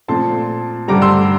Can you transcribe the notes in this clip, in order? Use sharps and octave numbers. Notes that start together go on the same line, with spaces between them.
A#2 F3 A3 C4 A5 C6
G2 D3 G3 A#5 D6
C6 E6